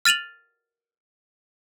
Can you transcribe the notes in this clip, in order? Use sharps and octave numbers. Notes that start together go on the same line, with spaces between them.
F6 A6 D#7 F7 F#7